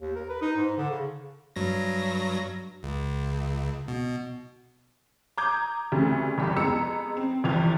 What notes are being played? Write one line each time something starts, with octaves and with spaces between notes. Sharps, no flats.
D#2
A#4
B4
D#4
G#2
D3
C#3
G2 F#3 A#6
C#2
B2
A#5 D6 D#6 G6 G#6
D2 C#3 G3 A3 C4
G1 C2 G2 G4
F2 G#3 B3 A#5 E6 C#7
C4
G1 D#2 E3 F3